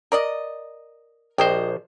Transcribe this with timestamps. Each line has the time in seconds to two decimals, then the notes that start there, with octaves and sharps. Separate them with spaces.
0.12 A#4 D5 D#5
1.38 A#1 G4 C5 D#5